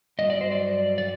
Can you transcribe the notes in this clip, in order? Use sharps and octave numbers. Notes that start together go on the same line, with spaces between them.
G2 F#3 D#5
D5
C5
D5
D5